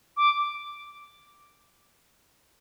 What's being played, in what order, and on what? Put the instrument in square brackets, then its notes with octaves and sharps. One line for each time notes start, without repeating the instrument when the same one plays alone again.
[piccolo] D6